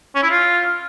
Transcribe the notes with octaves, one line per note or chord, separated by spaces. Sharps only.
C#4
E4
F4